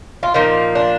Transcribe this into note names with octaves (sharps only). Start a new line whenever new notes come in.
F4
A#2 F3 A#3 D#4
D4